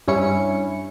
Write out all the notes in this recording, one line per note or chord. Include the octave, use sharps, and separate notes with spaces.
G2 C#4 E4 C#7